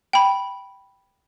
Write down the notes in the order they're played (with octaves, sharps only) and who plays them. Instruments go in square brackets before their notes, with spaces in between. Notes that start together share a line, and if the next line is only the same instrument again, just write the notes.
[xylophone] G5 B5